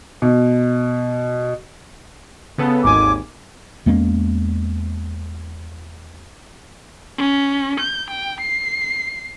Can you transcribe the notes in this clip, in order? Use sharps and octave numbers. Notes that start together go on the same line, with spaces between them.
B2
C#3 B3 A4
G#1 D#2 G#5 D6
E2 G#3 A#3 C#4
C#4
G6
G5
C7